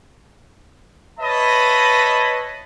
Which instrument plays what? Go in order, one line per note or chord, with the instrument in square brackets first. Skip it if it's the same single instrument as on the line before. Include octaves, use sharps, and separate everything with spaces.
[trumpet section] B4 C#5 D#5 E5 A5 B5